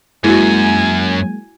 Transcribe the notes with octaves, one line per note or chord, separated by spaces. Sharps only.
F#2 G#3 A#3 E4 F#4 G#5